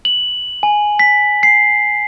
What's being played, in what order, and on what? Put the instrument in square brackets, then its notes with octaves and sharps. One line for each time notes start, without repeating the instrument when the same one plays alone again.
[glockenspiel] F#7
G#5
B6
C7